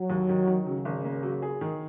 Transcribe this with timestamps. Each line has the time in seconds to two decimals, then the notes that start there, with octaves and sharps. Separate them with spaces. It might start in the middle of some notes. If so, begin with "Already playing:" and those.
Already playing: F#3
0.10 D#2
0.29 D#3
0.47 D#3
0.66 C#3 F#3
0.85 G#1
1.05 A#3
1.23 F#3
1.42 G#4
1.61 D#3